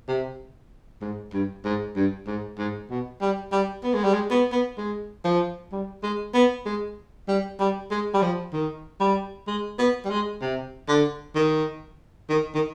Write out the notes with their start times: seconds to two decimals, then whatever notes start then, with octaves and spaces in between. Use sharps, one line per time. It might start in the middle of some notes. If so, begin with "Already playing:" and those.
0.08 C3
1.01 G#2
1.33 G2
1.65 G#2
1.96 G2
2.27 G#2
2.59 G#2
2.90 B2
3.21 G3
3.52 G3
3.84 B3
3.94 G#3
4.04 G3
4.14 G#3
4.30 B3
4.52 B3
4.78 G#3
5.25 F3
5.72 G3
6.03 G#3
6.34 B3
6.66 G#3
7.28 G3
7.60 G3
7.91 G#3
8.14 G3
8.22 F3
8.53 D#3
9.00 G3
9.47 G#3
9.79 B3
10.05 G3
10.10 G#3
10.41 C3
10.88 D3
11.35 D#3
12.29 D#3
12.55 D#3